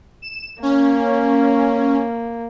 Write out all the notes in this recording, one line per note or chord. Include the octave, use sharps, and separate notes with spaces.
E7
A#3 C#4